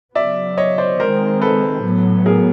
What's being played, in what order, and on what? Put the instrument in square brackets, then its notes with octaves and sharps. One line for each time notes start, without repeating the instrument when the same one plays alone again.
[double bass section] C#3 F#3 B3 [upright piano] D5 E5
[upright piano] C#5 D#5
C5 D5
[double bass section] D#3 G#3 C4 [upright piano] A#4 C5
[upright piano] A4 B4
[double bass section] A2 F#3 B3
[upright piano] G#4 A#4